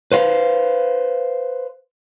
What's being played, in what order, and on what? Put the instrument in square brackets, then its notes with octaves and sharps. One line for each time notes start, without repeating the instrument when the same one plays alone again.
[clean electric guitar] B4 C5 F5